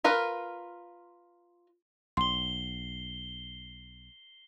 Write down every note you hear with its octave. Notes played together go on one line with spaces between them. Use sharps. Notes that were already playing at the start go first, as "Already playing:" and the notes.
F4 A#4 B4
B1 C6 C7 G7